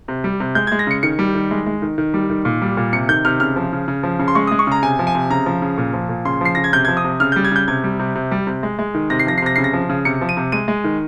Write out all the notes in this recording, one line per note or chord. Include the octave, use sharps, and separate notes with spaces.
C3
G3
C3
G#3 G6
G#3 G#6
A#6
C#3 C#7
D#3 C#7
G3
D#3
G#3
G#3
D#3
D#3
G3
D#3
A#2
G3
A#2
C3 C#7
D#3 G6
C3 F6
C#3 F6
F3
C#3
C#3
F3
C#3
C6
G#3 C#6
G#3 D#6
C#6
C#3 A#5
C3 G#5
F3
G#5
C3
C#3 A#5
F3
C#3
A#2
F3
A#2
C#3 C6
F3 C7
C#3 A#6
G#6
C3 G6
F3 G#6
D#6
C3
C#3 F6
G3 G6
G#6
C#3 G6
C3 G#6
G3
C3
C3
G3
C3
G#3
G#3
D#3
C3 A#6
C7
F3 A#6
C7
C3 A#6
C#3 C7
A#6
F3
C#3
C3 C#7
F3
D#7
C3
G#3 D#7
G#3
D#3